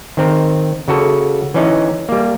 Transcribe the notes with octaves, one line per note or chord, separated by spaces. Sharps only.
D#3 C4 A#4
C#3 F#4 A4
E3 C#4 D#4
G3 A#3